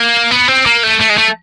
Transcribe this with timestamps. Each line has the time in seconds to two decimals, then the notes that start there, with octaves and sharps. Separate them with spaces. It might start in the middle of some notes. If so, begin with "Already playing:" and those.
Already playing: A#3
0.31 B3
0.48 C4
0.66 A#3
0.84 A3
1.01 A3
1.10 G#3
1.19 A3